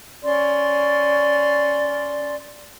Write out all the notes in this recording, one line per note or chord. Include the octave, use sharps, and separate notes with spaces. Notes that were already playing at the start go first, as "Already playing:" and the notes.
C#4 D5 C6